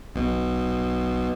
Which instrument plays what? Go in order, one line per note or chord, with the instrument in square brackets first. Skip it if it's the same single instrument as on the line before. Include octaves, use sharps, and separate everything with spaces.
[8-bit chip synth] B1 B2